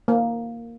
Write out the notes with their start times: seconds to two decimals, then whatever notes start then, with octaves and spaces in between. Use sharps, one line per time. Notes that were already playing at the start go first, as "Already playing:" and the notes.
0.08 A#3